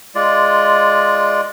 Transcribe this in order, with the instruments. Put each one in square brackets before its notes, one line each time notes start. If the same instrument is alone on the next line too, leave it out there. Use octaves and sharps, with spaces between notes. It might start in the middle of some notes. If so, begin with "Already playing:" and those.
[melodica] G#3 F4 D5